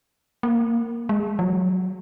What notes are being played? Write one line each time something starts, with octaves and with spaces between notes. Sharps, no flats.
A#3
G#3
F3
F#3